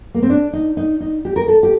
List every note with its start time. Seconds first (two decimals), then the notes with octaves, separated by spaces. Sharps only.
0.14 A#3
0.22 C4
0.30 D4
0.53 D#4
0.77 D#4
1.00 D#4
1.25 G4
1.36 A#4
1.48 A4
1.63 G4